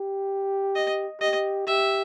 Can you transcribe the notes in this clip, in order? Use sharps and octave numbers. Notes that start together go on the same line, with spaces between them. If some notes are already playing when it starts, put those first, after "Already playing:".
Already playing: G4
D#5
G4 D#5
G4 E5